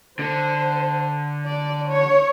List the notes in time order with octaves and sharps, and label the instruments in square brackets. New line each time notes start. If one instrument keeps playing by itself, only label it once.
[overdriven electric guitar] D3 [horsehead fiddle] C5
[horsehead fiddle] D5
C#5